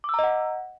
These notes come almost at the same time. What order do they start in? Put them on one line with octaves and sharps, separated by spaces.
D6 E6 A#5 D#5 F#5